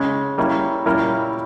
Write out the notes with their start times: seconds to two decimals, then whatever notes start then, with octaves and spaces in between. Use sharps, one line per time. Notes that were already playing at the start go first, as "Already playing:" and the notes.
Already playing: C#3 G#3 C#4
0.38 G3 A#3 C#4 E4
0.86 A#2 G3 C#4 E4 A#4